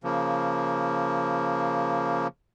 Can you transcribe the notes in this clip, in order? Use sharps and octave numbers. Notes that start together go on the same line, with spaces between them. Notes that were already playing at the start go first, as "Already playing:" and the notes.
C#3 F3 A#3